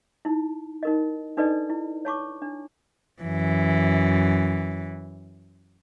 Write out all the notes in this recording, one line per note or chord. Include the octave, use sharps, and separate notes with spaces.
D#4 E4
D#4 A#4 D#5
D4 D#4 A4 B4 D5 D#5
E4
C#5 A5 C#6 D6
D4
F#2 E3